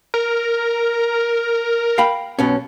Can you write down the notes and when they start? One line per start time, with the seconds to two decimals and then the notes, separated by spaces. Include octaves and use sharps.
0.14 A#4
1.98 F5 G5 B5
2.39 B1 B2 C#4